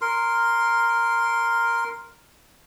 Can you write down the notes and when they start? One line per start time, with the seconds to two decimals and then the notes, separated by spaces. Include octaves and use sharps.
0.01 A#4 C6